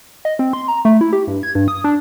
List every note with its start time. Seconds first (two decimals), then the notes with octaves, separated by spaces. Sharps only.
0.25 D#5
0.39 C4
0.53 C6
0.68 A#5
0.85 A3
1.01 E4
1.13 G4
1.27 G2
1.43 G#6
1.55 G2
1.68 D#6
1.84 D4